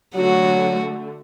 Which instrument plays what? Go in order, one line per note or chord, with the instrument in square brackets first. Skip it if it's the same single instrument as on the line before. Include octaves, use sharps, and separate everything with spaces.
[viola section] D3 A3 [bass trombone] F#3 [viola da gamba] F#4